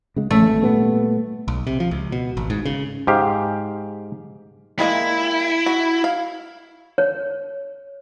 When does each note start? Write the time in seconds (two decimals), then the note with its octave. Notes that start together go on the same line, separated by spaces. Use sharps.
0.16 C#3 G#3
0.30 A#1 A3 C#4
0.46 G#1
0.62 A#2 G3 B3
1.48 B1
1.67 C3
1.80 F3
1.91 C#2
2.12 B2
2.37 G#1
2.50 G#2
2.65 C#3
3.07 G#2 G4 F5
4.79 G3 G#3 A#3 E4
5.66 F#4
6.04 F5
6.98 C#5